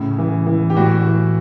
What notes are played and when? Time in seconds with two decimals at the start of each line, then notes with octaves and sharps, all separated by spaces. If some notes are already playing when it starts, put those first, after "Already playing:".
Already playing: A2 C#3
0.18 E3
0.47 E3
0.70 G4
0.77 A2 F#4
1.06 E3